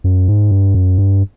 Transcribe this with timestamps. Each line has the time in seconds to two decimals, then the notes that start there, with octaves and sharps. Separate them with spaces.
0.04 F#2
0.28 G#2
0.51 G2
0.74 F#2
0.98 G2